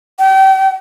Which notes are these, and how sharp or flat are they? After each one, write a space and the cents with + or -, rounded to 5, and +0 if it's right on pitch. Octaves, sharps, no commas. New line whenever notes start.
G5 -35